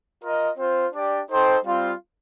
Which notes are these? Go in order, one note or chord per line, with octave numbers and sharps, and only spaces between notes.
F4 A#4 D#5
C4 F4 C5
D4 G4 D5
D#4 A4 C5 G5
G3 C4 F4